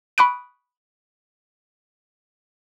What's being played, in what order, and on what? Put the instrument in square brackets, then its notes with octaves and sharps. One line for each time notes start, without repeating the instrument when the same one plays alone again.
[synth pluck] B5 C#6 D#6 F#6 D7